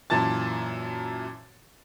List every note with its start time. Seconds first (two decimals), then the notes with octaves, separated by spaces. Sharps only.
0.10 F#2 A#2 E3 A5 A6